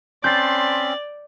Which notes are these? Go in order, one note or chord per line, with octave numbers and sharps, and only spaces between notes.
C4 C#4 D5 A5 B5 C6 G6 A6